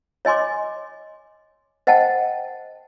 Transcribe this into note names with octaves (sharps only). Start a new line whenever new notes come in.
C#5 D#5 G#5 C6 D6
C5 D#5 F#5 G5 A5